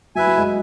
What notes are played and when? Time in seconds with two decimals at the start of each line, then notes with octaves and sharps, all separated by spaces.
0.15 F#3 E4 B4 E5 G#5
0.27 F#3
0.38 G#3